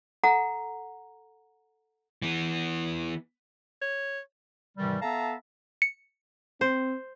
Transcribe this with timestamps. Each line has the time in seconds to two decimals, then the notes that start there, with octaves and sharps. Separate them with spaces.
0.24 A4 F#5 A#5
2.22 E3 B3
3.82 C#5
4.78 G#2 C3 D#3 E3 G3
5.02 B3 A4 E5 F5 A5 A#5
5.82 C#7
6.61 C4 C5